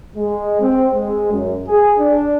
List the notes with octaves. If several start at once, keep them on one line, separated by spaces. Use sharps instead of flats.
G#3
C4
G#3
F#2
G#4
D4